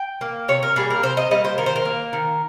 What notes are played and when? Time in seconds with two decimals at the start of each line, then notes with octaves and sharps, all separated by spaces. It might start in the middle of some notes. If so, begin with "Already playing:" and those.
Already playing: G5
0.21 A#3
0.48 C3 C#5
0.63 A#4
0.76 G3 A#3 G#4
0.90 A#4
1.03 C3 C5
1.17 D#5
1.31 G3 A#3 D#5
1.44 C5
1.58 D#3 A#4
1.66 C5
1.76 A#4
1.85 A#3
2.13 D#3